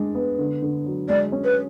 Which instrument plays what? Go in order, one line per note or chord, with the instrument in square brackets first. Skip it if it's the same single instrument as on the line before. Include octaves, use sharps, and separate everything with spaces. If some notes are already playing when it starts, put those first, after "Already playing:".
Already playing: [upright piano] G#3 D4
B3
D3
D3
F#3
[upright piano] G#3 [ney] D5
[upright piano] C#4
[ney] B4